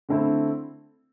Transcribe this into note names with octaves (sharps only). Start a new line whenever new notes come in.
D3 A3 C4 E4